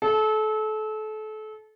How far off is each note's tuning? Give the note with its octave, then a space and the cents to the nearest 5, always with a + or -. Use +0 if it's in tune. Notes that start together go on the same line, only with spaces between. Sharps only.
A4 -30